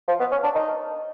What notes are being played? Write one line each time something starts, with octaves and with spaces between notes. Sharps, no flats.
F3
B3
C#4
D4
D#4